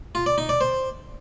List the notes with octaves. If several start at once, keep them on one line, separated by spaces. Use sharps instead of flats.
F4
D5
D#4
D5
C5